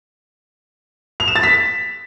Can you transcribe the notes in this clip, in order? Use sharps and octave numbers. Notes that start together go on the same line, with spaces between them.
F7
E7
A6
B6